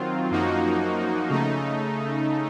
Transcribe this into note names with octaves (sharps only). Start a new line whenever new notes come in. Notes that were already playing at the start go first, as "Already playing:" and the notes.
Already playing: D#3 F#3 C4 F4
F#2 F3 A#3 D#4 F#4
C#3 A3 D#4